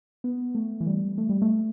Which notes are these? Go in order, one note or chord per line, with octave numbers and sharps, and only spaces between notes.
B3
A3
E3
G3
A3
G3
A3